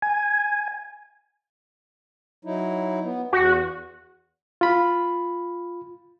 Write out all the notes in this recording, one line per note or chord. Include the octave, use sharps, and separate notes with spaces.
G#5
F#3 D#4 E4
B3
E2 F#4
F4 B5